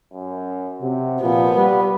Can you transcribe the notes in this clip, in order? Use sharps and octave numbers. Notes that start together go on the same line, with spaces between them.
F#2
C3 F#4
A#2 F3 B3
G3 B4